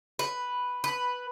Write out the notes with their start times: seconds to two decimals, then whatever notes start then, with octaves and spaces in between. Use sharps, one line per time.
0.19 B4
0.84 B4